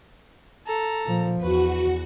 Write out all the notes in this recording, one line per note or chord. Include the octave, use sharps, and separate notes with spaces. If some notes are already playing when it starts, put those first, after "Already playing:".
A4 A#5
A#2 F3
E2 F#4 B4